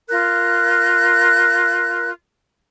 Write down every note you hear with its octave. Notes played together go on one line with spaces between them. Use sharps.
F4 A#4 F#6